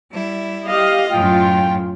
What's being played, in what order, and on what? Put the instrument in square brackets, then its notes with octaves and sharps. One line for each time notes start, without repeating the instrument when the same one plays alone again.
[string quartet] G3 E4
[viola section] G4 D#5 F5
[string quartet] F#2 A2 [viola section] F4 [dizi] G5